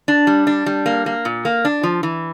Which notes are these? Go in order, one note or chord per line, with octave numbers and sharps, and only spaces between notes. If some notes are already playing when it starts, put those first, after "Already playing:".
D4
G3
D4
G3
A#3
A#3
A#2
A#3
D4
F3
E3